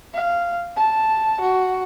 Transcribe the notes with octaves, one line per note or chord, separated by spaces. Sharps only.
F5
A5
F#4